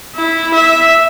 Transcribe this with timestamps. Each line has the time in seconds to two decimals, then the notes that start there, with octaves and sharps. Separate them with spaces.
0.16 E4
0.54 E5